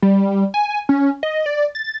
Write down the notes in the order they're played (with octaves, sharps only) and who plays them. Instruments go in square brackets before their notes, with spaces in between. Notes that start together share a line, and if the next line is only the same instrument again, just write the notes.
[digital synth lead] G3
G#5
C#4
D#5
D5
A6